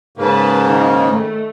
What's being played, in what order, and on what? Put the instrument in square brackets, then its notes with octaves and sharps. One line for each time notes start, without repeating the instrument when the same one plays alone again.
[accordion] G#2 C#3 A#3 [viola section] B4 A5
[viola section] D#3
A3